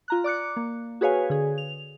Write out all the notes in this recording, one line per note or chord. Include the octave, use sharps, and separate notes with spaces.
F4 A#5 F#6
D5 D6 F#6 C#7
A#3
F#4 G#4 B4 C#5 F5 G#5
D3 G#4
F7